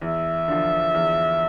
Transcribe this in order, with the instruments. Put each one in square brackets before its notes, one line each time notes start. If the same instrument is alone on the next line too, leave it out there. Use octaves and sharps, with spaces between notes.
[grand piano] E2 [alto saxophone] E5
[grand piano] D3 F3
E2